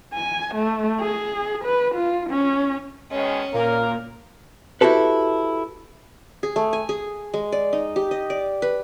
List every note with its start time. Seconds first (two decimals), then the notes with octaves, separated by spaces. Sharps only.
0.14 G#5
0.55 A3
1.01 G#4
1.65 B4
1.95 F4
2.30 C#4
3.11 B2 D#3 G#3 C#4
3.54 A#2 A#3 A#4
4.81 E4 F#4 G4 A4 B4
6.43 G#4
6.56 A3
6.73 G#5
6.89 G#4
7.34 G#3
7.52 D5
7.73 D#4
7.96 G4
8.11 D#5
8.30 D5
8.62 B4